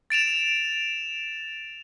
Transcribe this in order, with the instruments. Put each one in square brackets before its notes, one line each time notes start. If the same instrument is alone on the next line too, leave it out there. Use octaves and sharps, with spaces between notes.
[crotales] A6 D7 E7 F7